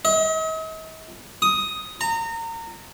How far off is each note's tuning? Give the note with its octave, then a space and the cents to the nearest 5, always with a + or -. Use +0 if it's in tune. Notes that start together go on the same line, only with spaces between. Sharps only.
D#5 +45
D#6 +10
A#5 -30